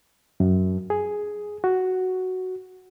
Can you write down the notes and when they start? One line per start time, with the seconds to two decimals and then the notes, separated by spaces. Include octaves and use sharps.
0.40 F#2
0.90 G#4
1.64 F#4